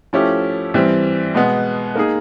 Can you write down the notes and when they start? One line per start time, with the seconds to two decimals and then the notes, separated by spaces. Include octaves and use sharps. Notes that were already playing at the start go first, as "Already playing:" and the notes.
0.13 F3 A3 C#4 E4 G4
0.74 E3 G3 C4
1.34 B2 G#3 B3
1.95 A#3 D#4 G#4